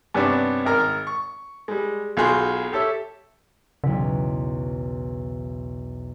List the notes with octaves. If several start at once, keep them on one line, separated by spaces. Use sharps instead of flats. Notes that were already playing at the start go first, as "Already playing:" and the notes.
G2 C3 B3 C#4 D4
G#1 A#4 F6
C#6
G3 G#3
B1 F4 F#4 G#4 C6 F#6
G4 A4 C#5 E5
B1 E2 C#3 B6